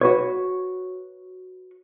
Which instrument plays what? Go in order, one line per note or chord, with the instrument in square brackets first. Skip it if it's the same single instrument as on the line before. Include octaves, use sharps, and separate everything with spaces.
[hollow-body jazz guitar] F#4 B4 C#5